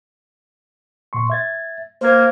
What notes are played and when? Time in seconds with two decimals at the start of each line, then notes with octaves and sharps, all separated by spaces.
1.13 A#2 C6 C#6
1.30 E5 G#6 A6
2.01 A#3 C5 G#6